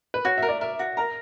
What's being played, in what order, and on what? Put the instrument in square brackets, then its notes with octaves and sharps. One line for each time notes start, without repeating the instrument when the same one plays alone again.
[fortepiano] B4
[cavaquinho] F#4 [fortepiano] C#5
[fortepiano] E5
[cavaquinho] A#4
[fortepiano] D5
[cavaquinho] A#4 [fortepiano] E5
[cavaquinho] F#4
[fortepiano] A#4 [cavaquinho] A#5